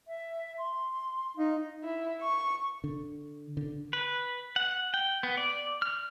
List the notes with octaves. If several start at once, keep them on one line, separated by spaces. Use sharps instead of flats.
E5
C6
D#4 F5
E4
C#6
D3
D3
B4
F#5
G5
B3
D5
F6